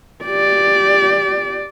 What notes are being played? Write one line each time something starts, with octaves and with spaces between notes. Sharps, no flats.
G4 D5